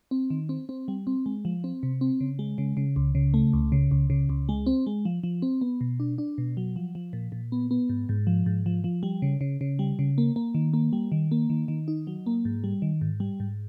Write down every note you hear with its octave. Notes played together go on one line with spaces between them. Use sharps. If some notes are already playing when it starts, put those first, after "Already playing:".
C4
D#3
C4
C4
G3
C4
G#3
F3
C4
C3
C4
C#3
G#3
C#3
C#3
C#2
C#3
A3
C#2
C#3
C#2
C#3
C#2
G#3
C4
G#3
F3
F3
C4
B3
B2
D4
D4
B2
F#3
F3
F3
A#2
A#2
B3
B3
G#2
G#2
F3
G#2
F3
F3
G3
C#3
C#3
C#3
G3
C#3
A#3
A#3
D#3
A#3
G3
D#3
A#3
D#3
D#3
D#4
F#3
A#3
G#2
G3
D#3
G#2
G3
G#2